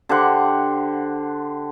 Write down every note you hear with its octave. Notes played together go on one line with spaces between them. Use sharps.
D3 G4 C5 F#5